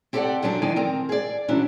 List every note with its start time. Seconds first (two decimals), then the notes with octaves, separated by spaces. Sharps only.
0.13 C4 G4 A4 B4 D5 F#5
0.42 F#2 F3 F#3 D4
0.62 E2 D#3 D5 G#5
0.76 C4 A#4
1.09 G#4 D5
1.48 C3 E3 F#3 C#4 D4